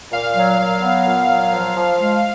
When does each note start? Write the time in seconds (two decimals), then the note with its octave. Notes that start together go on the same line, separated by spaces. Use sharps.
0.12 A#2 F5
0.35 F#3
0.59 F#3
0.82 B3
1.06 A#2
1.28 F#3
1.52 F3
1.75 F3
1.99 G#3